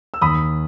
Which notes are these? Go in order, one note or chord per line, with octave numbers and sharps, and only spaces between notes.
E6
D#2 B5 D#6